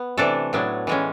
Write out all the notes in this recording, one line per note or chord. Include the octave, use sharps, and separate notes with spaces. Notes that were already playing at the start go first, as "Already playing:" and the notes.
Already playing: B3
C3 E3 A3 D4 A4
A2 F#3 B3 D4
A2 E3 G#3 C#4